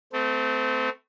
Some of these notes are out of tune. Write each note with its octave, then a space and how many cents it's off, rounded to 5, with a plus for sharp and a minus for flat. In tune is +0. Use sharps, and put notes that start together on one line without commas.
A3 +0 C4 -30